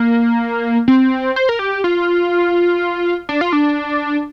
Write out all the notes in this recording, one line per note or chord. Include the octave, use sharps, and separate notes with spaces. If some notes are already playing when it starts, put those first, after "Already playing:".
Already playing: A#3
C4
C5
A#4
G4
F4
D4
F4
D4